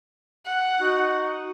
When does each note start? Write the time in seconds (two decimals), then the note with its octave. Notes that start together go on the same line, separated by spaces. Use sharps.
0.45 F#5
0.81 D#4 F#4